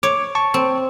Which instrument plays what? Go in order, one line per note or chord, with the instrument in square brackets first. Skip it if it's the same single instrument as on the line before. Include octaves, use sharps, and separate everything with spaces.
[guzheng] C#5 [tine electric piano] D6
[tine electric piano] A5 C#6
[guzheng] C4